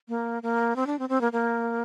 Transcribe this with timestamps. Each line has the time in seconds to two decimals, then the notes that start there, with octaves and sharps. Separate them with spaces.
0.08 A#3
0.43 A#3
0.76 C4
0.87 D4
0.99 C4
1.09 C4
1.21 A#3
1.32 A#3